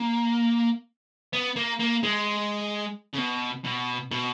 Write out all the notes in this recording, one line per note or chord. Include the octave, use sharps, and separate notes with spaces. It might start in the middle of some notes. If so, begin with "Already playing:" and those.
Already playing: A#3
B3
A#3
A#3
G#3
C#3
B2
B2
B2